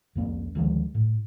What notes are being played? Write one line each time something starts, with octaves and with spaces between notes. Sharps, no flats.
C2 F2 A#3 C#4
D2 D#3 F3 G#3
A2